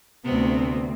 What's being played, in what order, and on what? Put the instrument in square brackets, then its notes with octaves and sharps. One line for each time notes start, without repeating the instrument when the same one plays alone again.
[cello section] D2 C4 [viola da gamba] C3 B3